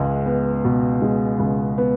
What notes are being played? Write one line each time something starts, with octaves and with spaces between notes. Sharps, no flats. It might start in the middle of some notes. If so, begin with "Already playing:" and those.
Already playing: C#2 G#3
B3
B2
G#3
C#2
B3